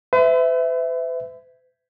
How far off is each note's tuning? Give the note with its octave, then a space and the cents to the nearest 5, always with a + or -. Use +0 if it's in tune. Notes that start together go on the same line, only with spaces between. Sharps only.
B4 +45 E5 +0